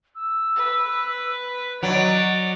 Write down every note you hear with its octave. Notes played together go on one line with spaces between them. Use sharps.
E6
B4
F#3 D5 D#5 D7